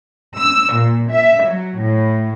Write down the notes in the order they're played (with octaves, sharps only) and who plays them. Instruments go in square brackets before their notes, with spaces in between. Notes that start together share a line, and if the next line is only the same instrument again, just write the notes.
[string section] E6
A#2
E5
F#3
A2